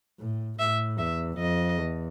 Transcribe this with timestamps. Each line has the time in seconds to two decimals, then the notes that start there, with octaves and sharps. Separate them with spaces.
0.20 A2
0.59 A2 E5
0.98 E2 E5
1.38 F2 D#5
1.78 E2